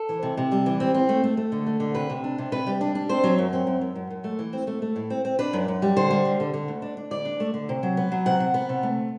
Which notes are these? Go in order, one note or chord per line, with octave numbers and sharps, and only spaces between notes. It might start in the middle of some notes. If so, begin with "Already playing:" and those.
Already playing: A4
E3
C3
C3
G3
E3
C4
C4
A3
A3
A3
D3
A3
D3
C3 B4
C3
D4
C3
C3 B4
G3
D4
D4
C4 C5
F#3
F#2
C4
F#2
F#2
F#2
F#2
A3
E3
C4
A3
A3
A2
C4
C4
D4 B4
F#2
F#2
G3
D3 C5
G3
D3
D3
D3
D2
D4
D4
D2 D5
D4
A3
D3
C3
F#3
B3
F#3
C3 F#5
C3
B3
C3
A3